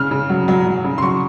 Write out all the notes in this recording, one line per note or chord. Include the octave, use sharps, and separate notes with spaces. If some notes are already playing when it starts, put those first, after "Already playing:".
Already playing: C#3 F6
C#3
F#3
F#3
F#3
C#3
C6
F#3 C#6